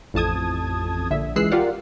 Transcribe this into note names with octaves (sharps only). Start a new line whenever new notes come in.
A1 F2 A5 D#6 G#6
A#1 D3 E5
C#2 E3 G#3 E6 F#6 C7
F4 G4 A#4 D5 F5 F#5